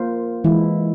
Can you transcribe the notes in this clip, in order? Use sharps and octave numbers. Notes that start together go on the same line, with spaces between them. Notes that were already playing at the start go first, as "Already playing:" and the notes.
Already playing: A#3 F4 C5
E3 G#3 E4